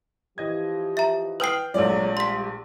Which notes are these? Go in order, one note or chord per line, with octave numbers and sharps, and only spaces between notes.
E3 F3 G4 D#5 G#6
E5 A#5
B4 G5 D#6 F6 C7
A#1 F3 F#3 G#3 A3 C#5 D5
G3 C6 B6